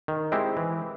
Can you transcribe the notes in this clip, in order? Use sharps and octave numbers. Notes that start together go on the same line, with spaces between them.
D#3
G#3 C4 E4 G4
E3